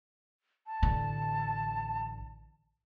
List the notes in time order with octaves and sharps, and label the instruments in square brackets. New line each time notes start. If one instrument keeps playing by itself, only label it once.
[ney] A5
[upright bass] A1 D3